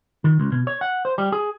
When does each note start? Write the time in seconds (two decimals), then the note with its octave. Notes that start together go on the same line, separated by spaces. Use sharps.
0.24 D#3
0.40 C#2
0.52 B2
0.67 C#5
0.81 F#5
1.05 C5
1.18 G3
1.32 G#4